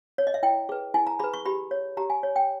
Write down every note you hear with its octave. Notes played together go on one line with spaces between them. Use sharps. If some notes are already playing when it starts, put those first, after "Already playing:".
C#5
D#5
E5
E4 G5
G#4 B4
E4 G#5
A#5
G#4 B4 B5
C#6
G4 B5
C#5
G4 A#5
G#5
C#5
G5